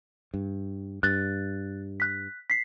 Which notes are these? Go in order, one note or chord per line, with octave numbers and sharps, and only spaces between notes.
G2
G2 F#6 A6
F#6 B6
B6 C7